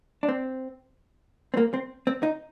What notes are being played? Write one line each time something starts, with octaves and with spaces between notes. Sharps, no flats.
D4
C4
C4
A#3
C4
C4
D#4